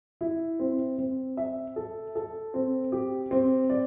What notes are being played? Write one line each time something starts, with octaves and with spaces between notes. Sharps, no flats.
E4
C4
C4
E5
A4
A4
C4
G4
C4
D5